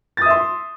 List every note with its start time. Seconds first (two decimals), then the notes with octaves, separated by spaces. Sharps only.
0.17 A6
0.22 D#6
0.26 E5
0.30 C6